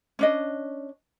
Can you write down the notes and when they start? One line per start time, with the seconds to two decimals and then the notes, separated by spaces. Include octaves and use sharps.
0.19 C#4 D4 D#5